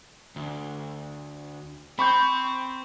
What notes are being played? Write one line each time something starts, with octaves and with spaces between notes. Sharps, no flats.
D2
C4 B5 C#6 G6